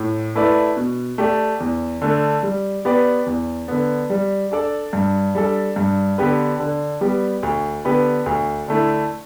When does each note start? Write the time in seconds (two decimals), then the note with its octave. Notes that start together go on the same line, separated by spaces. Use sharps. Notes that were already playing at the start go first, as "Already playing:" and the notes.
Already playing: A2
0.35 A3 E4 B4 D5
0.77 B2
1.18 A3 G4 D5
1.60 E2
2.02 D3 A3
2.43 G3
2.85 B3 G4 B4 D5
3.26 E2
3.68 D3 B3
4.10 G3
4.51 D4 A4 D5
4.93 G2
5.35 G3 D4 A4
5.76 G2
6.18 D3 B3 G4 B4
6.60 D3
7.01 G3 B3 G4
7.43 D2
7.85 D3 B3 G4 B4
8.26 D2
8.68 D3 A3 E4